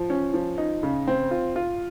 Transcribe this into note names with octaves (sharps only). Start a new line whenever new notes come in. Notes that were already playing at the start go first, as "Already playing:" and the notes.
Already playing: F3
C#4
F3
D#4
C#3
C4
F4
F4